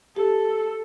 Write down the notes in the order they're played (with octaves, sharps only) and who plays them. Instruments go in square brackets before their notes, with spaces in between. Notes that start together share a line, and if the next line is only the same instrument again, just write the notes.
[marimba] G4 [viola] A4